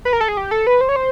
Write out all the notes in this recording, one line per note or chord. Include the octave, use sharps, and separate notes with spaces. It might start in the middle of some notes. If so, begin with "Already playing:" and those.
B4
A#4
A4
G#4
G4
A4
B4
C5
C#5
C5